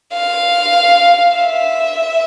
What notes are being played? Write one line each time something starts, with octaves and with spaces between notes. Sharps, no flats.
F5
E5